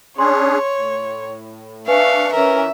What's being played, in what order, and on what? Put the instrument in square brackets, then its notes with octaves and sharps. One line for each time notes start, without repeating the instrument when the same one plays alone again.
[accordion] C#4 D4 G#4 [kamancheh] C#5 [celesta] C6
[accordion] A2
[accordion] D4 C#6 [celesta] B4 G#5 [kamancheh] E5 [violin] F5
[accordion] E3 [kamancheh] C#4 A#4 [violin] E5